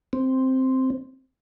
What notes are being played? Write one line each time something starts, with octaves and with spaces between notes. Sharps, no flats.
C4